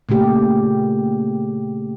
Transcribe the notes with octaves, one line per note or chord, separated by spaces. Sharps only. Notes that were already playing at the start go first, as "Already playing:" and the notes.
A#2 C#3 A3 G4